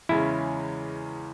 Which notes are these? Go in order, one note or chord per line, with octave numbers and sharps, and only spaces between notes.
E2 C#3 G#3 C#4 E4